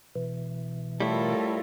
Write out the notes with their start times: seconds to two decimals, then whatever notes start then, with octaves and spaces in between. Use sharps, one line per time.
0.15 B2 E3
1.00 A2 G3 E4 F4 A4 A#4